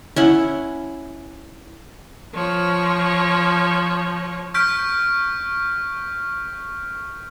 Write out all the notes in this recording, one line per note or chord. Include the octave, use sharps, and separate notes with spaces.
C#4 E4 F#5
F3 C#5
C#6 F6 G6 B6 D7